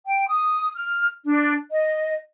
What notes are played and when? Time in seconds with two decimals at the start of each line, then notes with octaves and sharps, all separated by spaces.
0.06 G5
0.29 D#6
0.75 F6
1.25 D4
1.71 D#5